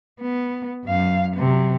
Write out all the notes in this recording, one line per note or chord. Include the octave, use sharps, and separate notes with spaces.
B3
F#2 F5
C3 F#3